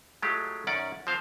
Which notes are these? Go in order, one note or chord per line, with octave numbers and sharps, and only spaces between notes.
F#3 G#3 A3 F4 G4
F#2 D#3 C#4 D5 F#5
F3 C4 C5 F5